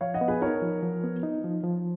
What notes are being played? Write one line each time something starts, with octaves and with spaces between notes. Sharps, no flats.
F3 C#5 F5
D#5 F#5
B3
G#4 B4
D#4 A#4 C#5
F3
F3
B3
D#4
F3
F3